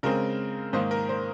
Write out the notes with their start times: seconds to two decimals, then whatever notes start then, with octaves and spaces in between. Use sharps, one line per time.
0.03 C#3 G#3 C4 A#4
0.73 G#2 D#3 A#3 C5
0.91 A#4
1.09 C5